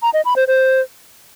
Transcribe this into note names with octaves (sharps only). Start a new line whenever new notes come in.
A#5
D#5
B5
C5
C5